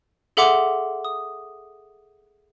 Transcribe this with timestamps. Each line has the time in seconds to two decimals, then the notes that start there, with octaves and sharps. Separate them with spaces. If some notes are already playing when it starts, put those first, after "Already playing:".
0.37 G#4 A4 E5 F#5 C6 D6
1.05 D#6